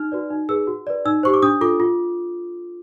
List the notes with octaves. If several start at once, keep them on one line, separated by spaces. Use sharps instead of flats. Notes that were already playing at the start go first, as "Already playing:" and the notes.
Already playing: D#4 F6
F#4 B4 D5
D#4
G#4 B4 E6
F#4
B4 D5
D#4 E6
G4 C5 C#6
D6
D4 D#6
F4 A4 D6
F4